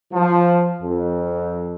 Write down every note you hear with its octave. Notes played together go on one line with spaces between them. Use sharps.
F3
F2